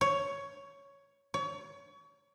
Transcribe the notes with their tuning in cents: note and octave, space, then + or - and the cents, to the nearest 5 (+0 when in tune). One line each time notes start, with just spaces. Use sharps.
C#5 +10
C#5 +30